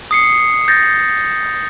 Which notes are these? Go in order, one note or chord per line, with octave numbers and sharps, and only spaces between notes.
D#6 C7 C#7
G6 A6 A#6